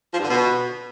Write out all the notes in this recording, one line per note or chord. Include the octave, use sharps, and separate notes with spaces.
F3
G2
D3
B2